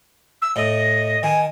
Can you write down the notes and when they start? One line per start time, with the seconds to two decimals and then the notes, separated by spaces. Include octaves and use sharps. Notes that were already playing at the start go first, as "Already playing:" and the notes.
0.41 E6
0.56 A2 D#5
1.23 D#3 G#5